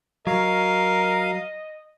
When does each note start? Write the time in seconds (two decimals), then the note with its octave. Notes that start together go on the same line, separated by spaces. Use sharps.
0.27 F#3 A#4 D#5 F5